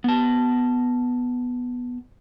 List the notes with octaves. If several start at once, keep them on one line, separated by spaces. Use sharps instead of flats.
B3 A5